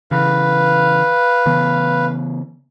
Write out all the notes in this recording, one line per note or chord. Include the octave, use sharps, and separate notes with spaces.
C#3 E3 B4 F5
C#3 E3 B3